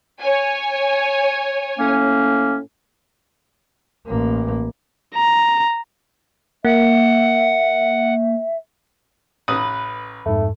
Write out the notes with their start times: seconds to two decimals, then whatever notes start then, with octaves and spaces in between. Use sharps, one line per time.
0.20 C#5 G#5
1.79 A2 A#3 C#4
4.06 A1 A#3
5.15 A#5
6.65 A#3 E5 F#5
9.48 A1 B4 D#6
10.26 F2 G#2 A3